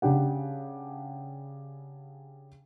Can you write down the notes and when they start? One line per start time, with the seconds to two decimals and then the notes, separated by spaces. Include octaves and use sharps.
0.02 C#3 D4 G4 F#5